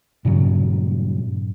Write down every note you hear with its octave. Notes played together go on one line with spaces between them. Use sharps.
G2 A#2 C#3 F#3